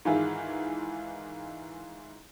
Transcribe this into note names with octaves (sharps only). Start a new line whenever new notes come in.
G#2 D#3 E3 E4 F4 G#4